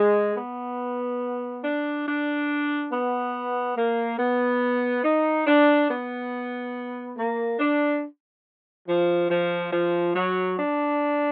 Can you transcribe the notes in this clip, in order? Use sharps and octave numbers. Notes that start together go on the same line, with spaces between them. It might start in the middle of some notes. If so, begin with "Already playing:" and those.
Already playing: G#3
B3
D4
D4
B3
A#3
B3
D#4
D4
B3
A#3
D4
F3
F3
F3
F#3
D4